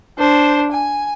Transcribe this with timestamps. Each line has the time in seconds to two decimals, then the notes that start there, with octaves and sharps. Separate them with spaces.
0.19 D4 C5
0.72 G#5